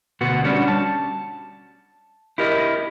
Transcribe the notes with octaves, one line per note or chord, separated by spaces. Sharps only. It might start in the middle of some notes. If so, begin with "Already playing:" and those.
D2 B2 B3 F#4
G3 C#4 D4 F#4
A5
E4 G4 A#4 D#5